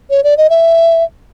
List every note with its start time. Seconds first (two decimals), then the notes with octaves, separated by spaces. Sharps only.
0.10 C#5
0.24 D5
0.37 D#5
0.50 E5